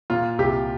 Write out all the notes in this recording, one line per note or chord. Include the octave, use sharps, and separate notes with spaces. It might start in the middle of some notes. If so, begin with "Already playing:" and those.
A#2 F4
C2 G4